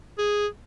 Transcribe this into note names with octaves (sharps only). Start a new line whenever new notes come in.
G#4